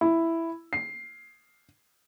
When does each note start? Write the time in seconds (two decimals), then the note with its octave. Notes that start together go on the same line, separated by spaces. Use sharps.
0.01 E4
0.73 C7